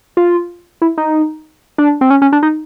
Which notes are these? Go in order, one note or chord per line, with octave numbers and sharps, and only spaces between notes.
F4
E4
D#4
D4
C4
C#4
C#4
D4
D#4